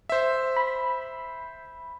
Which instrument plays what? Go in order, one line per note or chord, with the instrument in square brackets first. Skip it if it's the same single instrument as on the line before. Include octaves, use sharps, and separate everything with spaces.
[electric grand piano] C5 E5
[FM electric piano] B5